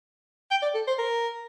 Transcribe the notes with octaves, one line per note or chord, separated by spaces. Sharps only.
G5
D5
A4
C5
A#4